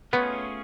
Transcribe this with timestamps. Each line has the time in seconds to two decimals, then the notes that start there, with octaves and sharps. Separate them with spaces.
0.13 A3 B3 C#4 F4 G#4 C#5